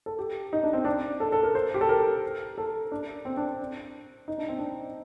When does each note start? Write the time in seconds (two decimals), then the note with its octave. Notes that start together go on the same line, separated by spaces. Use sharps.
0.06 A4
0.19 G4
0.53 D#4
0.63 D4
0.73 C4
0.85 D4
1.20 A4
1.32 A4
1.43 A#4
1.55 C5
1.74 G4
1.81 A4
1.89 A#4
2.58 A4
2.92 D4
3.25 C4
3.37 D4
4.28 D#4
4.38 D4
4.48 C4
4.58 D4